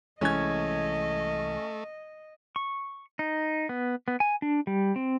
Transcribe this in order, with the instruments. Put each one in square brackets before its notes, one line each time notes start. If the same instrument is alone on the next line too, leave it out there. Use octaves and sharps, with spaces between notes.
[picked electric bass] C2 E3 G#3 [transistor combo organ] A3 [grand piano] C#4 G#6 [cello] D#5
[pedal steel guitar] C#6
D#4
B3
B3
G#5
D4
G3
C4